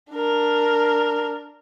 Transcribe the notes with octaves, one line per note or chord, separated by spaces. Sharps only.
D4 A#4